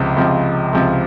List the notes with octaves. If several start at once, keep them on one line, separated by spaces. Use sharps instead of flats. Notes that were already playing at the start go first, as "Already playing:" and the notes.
Already playing: C#2 C3 F3
C#2 C3 F3
C#2 C3 F3